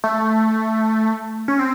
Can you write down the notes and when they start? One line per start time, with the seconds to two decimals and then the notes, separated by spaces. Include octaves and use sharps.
0.04 A3
1.48 C#4
1.59 C4